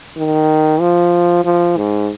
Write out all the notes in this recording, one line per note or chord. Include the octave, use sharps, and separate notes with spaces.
D#3
F3
F3
G#2